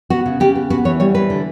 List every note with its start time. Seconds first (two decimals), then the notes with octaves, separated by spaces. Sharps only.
0.10 B3 F#4
0.26 C#3
0.40 C#3 G4
0.55 B3
0.70 B3 F#4
0.85 E3 C#5
1.00 G3 C#5
1.15 E3 B4
1.30 D3